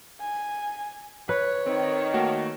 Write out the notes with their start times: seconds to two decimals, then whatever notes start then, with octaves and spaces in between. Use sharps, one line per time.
0.21 G#5
1.29 B4 C#5
1.66 D#3 C4
2.14 A3 A#3 F#4